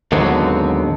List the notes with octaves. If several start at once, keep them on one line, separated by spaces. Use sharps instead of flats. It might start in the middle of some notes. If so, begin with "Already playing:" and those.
D#2 G#2 D3 F#3 B3 C4